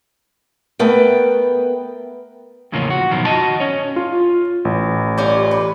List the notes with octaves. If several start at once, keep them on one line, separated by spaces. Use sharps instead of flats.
A3 B3 A#4 B4 G5
E2 A2 C#3 F3 A#3 C#4
F#4
F#2 B2 D#3 F3
F#4 D#5 A5
C#4 C#5
F4
A1
G3 C#4 F4
B4